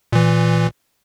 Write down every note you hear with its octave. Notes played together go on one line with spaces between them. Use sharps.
A#2 E3